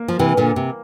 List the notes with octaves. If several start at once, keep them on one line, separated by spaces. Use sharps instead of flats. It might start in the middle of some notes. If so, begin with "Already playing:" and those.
Already playing: A#3
F3
C3 E3
A#2 D3
C3